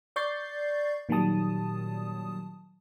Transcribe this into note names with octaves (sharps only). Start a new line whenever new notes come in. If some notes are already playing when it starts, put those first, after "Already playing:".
D5 C#6 G6 A6 C7
A#2 D#3 F#3 G3 A5 D#6